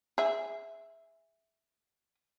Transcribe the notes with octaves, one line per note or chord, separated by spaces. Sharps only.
G#4 E5